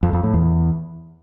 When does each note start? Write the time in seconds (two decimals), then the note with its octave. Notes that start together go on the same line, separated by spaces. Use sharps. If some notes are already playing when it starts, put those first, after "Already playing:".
0.03 F2
0.13 F2
0.23 A2
0.34 E2